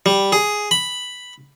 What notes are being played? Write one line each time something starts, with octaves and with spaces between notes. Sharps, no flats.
G3
G#4
B5